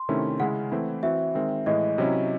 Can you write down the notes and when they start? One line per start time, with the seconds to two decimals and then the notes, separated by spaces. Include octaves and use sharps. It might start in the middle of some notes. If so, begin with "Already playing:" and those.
Already playing: C6
0.09 C3 D#3 A3 C#4 E4
0.40 C#3 G#3 C#4 E4 F#5
0.72 E3 A3 C4 E4
1.03 E3 C4 F#4 E5
1.35 D#3 G#3 C4
1.66 A2 E3 G#3 D#5
1.98 C3 F#3 C#4 E4